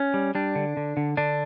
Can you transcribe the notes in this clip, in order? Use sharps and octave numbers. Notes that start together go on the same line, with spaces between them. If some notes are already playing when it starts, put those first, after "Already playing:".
Already playing: C#4
G3
G3 D4
D3
D3
D3
D3 D4